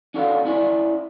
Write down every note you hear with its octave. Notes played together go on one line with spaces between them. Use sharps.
C#4 D4 F#4 A4 F5
C#4 E4 D5 E5 G#5